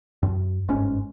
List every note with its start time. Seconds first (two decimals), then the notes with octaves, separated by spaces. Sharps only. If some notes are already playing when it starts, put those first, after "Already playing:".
0.23 F#2
0.68 G1 G#2 C#4